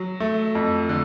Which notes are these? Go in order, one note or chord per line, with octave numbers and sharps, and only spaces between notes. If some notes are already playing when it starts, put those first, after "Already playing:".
Already playing: F#3
A3
F2
D3